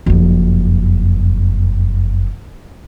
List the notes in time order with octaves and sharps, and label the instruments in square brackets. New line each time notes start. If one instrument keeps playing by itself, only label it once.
[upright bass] F#1 F2